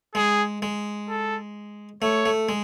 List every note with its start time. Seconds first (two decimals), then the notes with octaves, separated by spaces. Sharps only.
0.15 G#3 G#4
0.62 G#3
1.09 A4
2.02 A3 C#5
2.26 A3
2.49 G#3